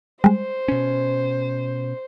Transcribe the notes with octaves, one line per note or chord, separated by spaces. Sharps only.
G3 G#3 C5
B2 C#4